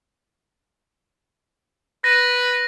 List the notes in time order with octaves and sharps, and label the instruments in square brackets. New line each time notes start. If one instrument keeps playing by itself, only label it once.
[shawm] B4 [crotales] A#6